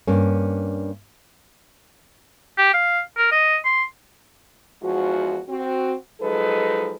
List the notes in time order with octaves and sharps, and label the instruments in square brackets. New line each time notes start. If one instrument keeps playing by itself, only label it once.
[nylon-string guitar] G2 A#3 C#4
[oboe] G4
F5
A#4
D#5
C6
[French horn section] E2 G#2 F3 G#3 F#4
C4 F#4
F3 F#3 G#3 D#4 A4 B4